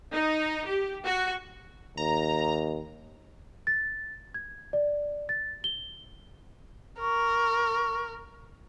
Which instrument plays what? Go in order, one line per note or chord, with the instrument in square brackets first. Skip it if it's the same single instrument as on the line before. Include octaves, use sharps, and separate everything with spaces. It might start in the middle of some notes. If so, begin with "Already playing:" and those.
[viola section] D#4
G4
F#4
[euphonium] D#2 [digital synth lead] A#5
[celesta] A6
G#6
D5
A6
G7
[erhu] A#4 [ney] C#6